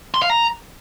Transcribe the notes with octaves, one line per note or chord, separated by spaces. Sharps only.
C6
F5
A#5